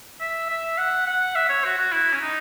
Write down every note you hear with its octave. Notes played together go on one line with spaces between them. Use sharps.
E5
E5
F#5
F#5
E5
C#5
F#4
F#4
E4
C#4
D#4